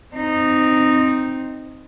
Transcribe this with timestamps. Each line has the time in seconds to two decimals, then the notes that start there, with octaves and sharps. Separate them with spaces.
0.14 C4 D#4